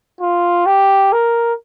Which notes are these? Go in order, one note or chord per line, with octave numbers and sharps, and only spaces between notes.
F4
G4
A#4